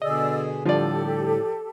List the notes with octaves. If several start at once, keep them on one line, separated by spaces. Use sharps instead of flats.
B2 D3 G#4 D5 D#5 E6
A2 D3 F3 G3 G4 A4 D5